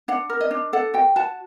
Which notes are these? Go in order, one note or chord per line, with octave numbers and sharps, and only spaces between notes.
D4 F#5
A#4
D#5
D4
A4 F#5
F#4 G5
F#4 A5